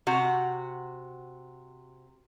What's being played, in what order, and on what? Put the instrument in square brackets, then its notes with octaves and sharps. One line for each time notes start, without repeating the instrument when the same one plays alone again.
[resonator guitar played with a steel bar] C3 F#4